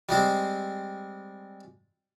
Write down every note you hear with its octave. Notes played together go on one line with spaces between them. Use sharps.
G3 G#3 C4